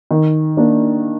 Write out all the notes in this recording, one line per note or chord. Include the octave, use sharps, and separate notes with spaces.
D#3
A#3 D4